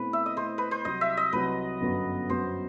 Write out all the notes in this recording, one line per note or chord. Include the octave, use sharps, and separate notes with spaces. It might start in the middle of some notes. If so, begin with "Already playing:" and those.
Already playing: B2 A3 C4 E4 B4
E5
D#5
B2 A3 C4 E4 C5
B4
C5
C2 C3 F#3 D#5
E5
D#5
C2 C3 F#3 B4
G1 F#2 F#3 B3 F#4
G1 F#2 F#3 B3 F#4 C5